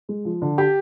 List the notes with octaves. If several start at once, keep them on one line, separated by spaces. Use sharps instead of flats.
G#3
F3
D3
G4 G5